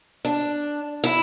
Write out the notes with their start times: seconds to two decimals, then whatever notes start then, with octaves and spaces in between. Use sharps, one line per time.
0.25 D4
1.04 E4